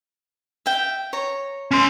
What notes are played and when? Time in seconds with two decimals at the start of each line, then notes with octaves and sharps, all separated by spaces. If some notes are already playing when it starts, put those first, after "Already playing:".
0.66 E5 F5 G5
1.13 C#5 A#5
1.71 C#4 C6